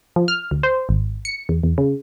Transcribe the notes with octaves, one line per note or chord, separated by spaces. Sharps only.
F3
F6
D2
C5
G#1
C#7
E2
E2
C#3